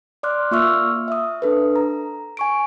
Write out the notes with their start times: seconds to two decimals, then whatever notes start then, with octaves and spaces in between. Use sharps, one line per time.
0.23 D5 C6 D6 F6 F#6
0.51 A#3 F4 E5 C#6 E6 F6
1.08 E5 D#6
1.42 D4 A4 B4
1.76 A#5
2.37 G#5 C#6 D7